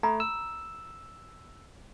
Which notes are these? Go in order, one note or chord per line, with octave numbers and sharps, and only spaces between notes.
A3 A#5 B5
E6